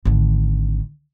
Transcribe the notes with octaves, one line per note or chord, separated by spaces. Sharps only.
G#1 D3